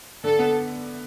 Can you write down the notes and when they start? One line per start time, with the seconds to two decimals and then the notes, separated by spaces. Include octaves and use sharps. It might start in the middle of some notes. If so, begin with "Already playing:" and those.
0.24 D3 A4
0.39 B3